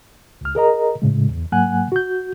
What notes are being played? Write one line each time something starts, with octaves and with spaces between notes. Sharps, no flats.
C#2 F6
G#4 A#4 D#5 A#5
A2 C#3 G#3
E2
G#2 F#3 A#3 F#5 G#5 F#6
F#4 G6